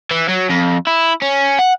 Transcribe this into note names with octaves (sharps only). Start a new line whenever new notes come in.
E3
F#3
F2
E4
C#4
F#5